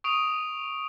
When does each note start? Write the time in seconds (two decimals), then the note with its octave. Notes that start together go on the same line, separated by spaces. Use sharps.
0.04 C#6 D#6 D7 F7